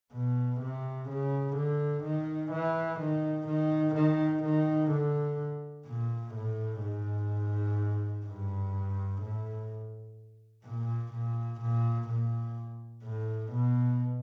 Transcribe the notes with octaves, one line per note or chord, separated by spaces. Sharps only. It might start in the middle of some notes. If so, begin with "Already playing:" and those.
B2
C3
C#3
D3
D#3
E3
D#3
D#3
D#3
D#3
D3
A#2
A2
G#2
G2
A2
A#2
A#2
A#2
A#2
A2
B2